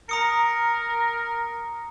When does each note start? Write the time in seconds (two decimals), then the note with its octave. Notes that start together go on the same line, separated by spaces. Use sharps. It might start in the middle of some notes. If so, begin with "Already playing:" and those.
0.09 A#4 A#5 D#6 C#7